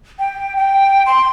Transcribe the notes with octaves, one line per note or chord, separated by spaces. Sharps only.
G5
G5
C6